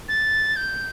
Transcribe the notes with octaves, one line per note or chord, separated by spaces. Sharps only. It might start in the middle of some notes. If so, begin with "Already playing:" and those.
A6
G6